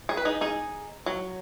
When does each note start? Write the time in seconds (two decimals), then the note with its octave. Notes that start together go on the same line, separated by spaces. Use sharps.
0.09 G#4
0.17 B4
0.25 D#4 G#4
0.41 D#4 G#4
1.06 F#3